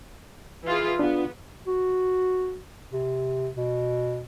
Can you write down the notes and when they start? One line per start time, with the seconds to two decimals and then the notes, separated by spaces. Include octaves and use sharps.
0.64 E3 F4 G#4
0.99 B3 D4 F4
1.67 F#4
2.93 C3
3.57 B2